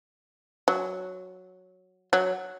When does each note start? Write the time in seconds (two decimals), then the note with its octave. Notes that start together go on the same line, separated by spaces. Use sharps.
0.68 F#3
2.13 F#3